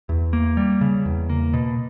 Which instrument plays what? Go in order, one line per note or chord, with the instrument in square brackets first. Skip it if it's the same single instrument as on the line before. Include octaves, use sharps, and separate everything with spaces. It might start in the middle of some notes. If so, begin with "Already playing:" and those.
[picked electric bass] E2
A#3
G3
C#3
E2
A#3
B2